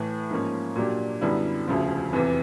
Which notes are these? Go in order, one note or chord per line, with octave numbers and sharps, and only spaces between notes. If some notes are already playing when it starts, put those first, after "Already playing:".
Already playing: A2 E3 A3
G#2 F3 A#3 C#4
A#2 F#3 A#3 D4 G4
F#2 D3 G3 B3 E4
E1 D2 C#3 F3
F1 E2 C3 E3